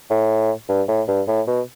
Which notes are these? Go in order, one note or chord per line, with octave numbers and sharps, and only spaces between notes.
A2
G2
A2
G2
A2
B2